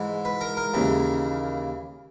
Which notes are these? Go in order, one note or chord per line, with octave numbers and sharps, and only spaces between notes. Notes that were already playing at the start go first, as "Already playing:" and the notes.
Already playing: G#2 E3
B4
A#4
A#4
D#2 C#3 E3